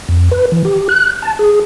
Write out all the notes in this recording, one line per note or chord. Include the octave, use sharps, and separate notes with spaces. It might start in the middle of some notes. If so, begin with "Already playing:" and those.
F2
B4
E3
G4
F#6
A5
G#4